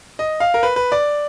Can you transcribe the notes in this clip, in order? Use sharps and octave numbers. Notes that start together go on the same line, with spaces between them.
D#5
F5
A#4
B4
B4
D5